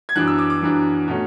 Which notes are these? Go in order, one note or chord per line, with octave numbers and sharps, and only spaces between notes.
G#6
F#2 E3 B3 D4 F#6
E6
D6
D6
F#2 E3 B3 D4
B2 A3 C#4